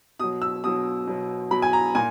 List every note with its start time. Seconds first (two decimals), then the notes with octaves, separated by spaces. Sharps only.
0.19 B2 D#6
0.24 F#3
0.42 E6
0.64 B2 F#3 D#6
1.07 B2 F#3
1.51 B2 F#3 B5
1.62 G#5
1.73 A#5
1.95 A#2 G#5